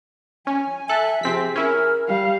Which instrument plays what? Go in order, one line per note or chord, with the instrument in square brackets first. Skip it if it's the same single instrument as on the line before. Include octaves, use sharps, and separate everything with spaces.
[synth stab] C#4 [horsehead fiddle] G#5
[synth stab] A4 F#6 [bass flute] E5
[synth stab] C3 C4 B6 [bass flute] F3 [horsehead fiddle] G#4
[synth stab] C#4 E4 [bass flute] A#4
[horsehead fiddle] G3 F5